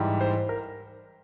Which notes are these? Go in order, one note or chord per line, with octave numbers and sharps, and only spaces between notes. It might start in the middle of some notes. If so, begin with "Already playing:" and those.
Already playing: G#2 E3 G3
C5
A#4